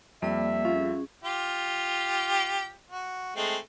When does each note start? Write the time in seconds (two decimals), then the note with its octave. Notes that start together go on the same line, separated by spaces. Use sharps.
0.22 F2 G3 A#3 D5 E5
0.65 C#4 F4 G#4
1.24 F4 G4
2.90 F#4
3.36 G#3 A3 C4